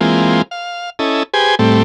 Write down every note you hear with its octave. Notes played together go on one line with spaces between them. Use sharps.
E3 G#3 A#3 C4 F4
F5
C#4 E4 A4 D#5
G4 G#4 B4 C5 G#5
A2 G3 A3 C4